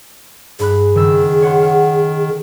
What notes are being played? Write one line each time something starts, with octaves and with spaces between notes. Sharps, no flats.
G2 G#4 B5 F#6
F#1 D#3 E6
C#5 F#5 C6
F6